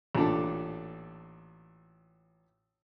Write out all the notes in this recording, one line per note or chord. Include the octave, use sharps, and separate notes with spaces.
A1 A#2 D4 A4